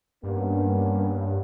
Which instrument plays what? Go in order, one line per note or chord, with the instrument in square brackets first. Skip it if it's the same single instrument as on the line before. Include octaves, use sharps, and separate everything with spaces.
[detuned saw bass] G2 [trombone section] A#3 B3 C#4